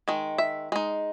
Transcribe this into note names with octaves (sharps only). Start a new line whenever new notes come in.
D#3 G#3
E5
G#3 D#4